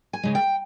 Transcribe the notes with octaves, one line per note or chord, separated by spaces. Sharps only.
G#5
C#3 G#3
G5